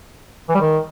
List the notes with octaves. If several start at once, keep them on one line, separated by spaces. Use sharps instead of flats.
E3
G3
D#3